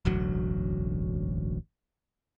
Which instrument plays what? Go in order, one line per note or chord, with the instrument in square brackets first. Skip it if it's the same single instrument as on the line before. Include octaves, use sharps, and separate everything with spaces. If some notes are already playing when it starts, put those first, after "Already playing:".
[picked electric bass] E1 A1 D2 F#3